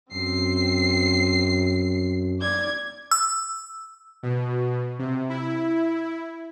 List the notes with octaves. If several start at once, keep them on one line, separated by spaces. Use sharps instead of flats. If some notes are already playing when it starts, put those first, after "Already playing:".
F#2 C4 C7
D5 G#6
E6
B2
C3
E4